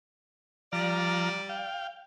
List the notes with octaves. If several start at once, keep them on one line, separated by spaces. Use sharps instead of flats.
F3 G3 D5 A#5 F6
F5 G5